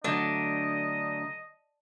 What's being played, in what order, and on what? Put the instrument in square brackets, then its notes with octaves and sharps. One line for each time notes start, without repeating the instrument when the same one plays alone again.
[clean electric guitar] D3 F#3 A3 [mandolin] D4 [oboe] D#5